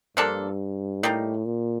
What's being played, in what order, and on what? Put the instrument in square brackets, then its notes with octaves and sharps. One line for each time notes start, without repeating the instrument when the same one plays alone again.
[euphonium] G2 [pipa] F3 A#3 D4 A4
[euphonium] A2 [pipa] G3 A#3 D#4
[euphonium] A#2